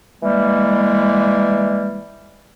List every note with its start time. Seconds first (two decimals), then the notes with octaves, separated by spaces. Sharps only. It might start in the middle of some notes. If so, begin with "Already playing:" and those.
0.21 E3 G3 G#3 A#3